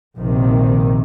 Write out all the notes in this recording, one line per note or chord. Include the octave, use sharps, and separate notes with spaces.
A#1 C3 D#3